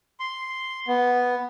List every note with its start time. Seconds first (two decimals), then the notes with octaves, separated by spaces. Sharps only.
0.20 C6
0.88 B3